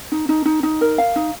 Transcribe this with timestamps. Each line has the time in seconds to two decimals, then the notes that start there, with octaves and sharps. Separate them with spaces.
0.12 D#4
0.29 D#4
0.45 D#4
0.63 D#4
0.81 A#4
0.98 F5
1.16 D#4